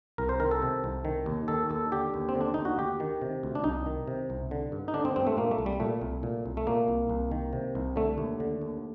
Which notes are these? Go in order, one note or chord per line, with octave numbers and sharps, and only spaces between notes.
C2 A#4
C5
D#3 A#4
A4
C3
C2
D#3
D#2
D#3 A4
D#2 A4
D3 G4
D#2
C4
D3
D4
D#2 D#4
F#4
D2 G4
D#3
C3
D2
D4
C2 D#4
D#3
C3
C2
D3
G2
D#4
D3 D4
C4
G2 C4
A3
A#2 A#3
A3
C2
G3
A#2 A3
C2
A#2
C2
A3
A#2 A#3
C2
C2
D#3
C3
C2
D3 A3
D#2
D3
D#2